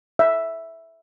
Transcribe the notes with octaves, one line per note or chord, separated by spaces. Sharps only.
E5